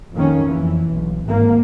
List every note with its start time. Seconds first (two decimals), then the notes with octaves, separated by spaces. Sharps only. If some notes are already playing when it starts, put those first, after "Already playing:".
0.14 F2 D#3 A#3 C#4
0.47 F2 E3
0.93 B1
1.26 G#1 A#3